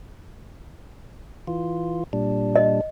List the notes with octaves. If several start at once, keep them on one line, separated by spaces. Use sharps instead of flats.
E3 F4
A#2 G3 D4
D#5